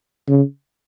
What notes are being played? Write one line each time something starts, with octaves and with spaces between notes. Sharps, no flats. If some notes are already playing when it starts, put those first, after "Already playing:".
C#3